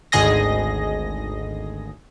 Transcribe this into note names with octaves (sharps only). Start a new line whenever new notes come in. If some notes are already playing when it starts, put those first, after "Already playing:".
G#1 D2 G#4 D#5 A#6